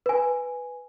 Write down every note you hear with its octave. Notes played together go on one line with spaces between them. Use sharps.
B4 G#5